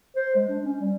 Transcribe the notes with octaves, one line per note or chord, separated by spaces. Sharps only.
C5
G#3
D4
C#4
G3